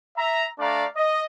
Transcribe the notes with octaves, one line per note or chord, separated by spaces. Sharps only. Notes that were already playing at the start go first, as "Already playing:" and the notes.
E5 A#5
A3 D4 D5 F5 A#5
D#5